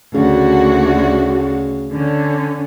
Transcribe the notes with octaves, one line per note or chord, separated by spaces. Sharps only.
D2 C#3 D4 F#4
D3 C#4